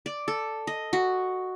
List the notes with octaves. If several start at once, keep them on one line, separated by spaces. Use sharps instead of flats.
D5
A4
D#5
F#4